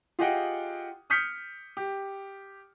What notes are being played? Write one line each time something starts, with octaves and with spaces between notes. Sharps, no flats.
F4 G4 G#4 D#5 F#5 G5
D#6 F6 G6 B6 C#7
G4